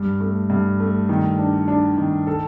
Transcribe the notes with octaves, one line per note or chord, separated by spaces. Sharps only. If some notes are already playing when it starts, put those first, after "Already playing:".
Already playing: G2
A3
G2
A3
D#3
D4
D4
D#3
A4